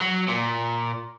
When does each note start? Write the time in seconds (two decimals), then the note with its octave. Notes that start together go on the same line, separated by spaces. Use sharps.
0.01 F#3
0.29 A#2